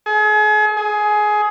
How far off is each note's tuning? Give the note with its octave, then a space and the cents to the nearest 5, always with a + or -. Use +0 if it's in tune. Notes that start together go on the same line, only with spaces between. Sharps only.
G#4 +35
G#4 +15